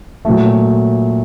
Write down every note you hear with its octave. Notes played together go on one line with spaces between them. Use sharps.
A#2 F#3 A3